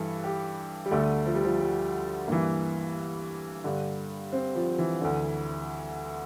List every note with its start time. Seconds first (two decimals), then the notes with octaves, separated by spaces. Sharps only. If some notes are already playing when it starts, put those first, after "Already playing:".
Already playing: G2 E3 A4
0.24 G4
0.86 G3
0.91 D2 D3 A3
1.26 F3
1.35 G3
1.45 F3
1.60 G3
2.28 G2 E3 A#3
3.64 G2 D3
4.33 C4
4.56 F3
4.78 E3
5.01 D2 D3